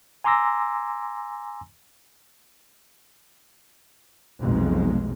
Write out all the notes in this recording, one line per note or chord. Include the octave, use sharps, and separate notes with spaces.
G#5 A#5 C6 D6 E6 A#6
F1 B1 F2 B2 G#3